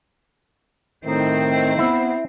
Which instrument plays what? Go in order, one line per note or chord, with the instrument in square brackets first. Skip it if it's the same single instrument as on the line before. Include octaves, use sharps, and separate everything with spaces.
[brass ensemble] A2 D#3 [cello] C4 C5 [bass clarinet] D#4
[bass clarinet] B3 [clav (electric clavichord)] E4